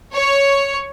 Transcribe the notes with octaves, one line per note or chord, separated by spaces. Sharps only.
C#5